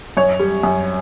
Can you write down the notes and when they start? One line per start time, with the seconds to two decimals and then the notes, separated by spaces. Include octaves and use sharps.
0.17 F#2 C#5
0.40 G3
0.63 F#2